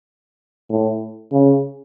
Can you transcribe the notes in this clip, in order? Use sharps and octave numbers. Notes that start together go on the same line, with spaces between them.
A2
C#3